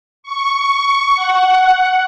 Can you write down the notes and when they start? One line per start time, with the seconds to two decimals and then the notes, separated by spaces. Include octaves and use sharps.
0.23 C#6
1.15 F#5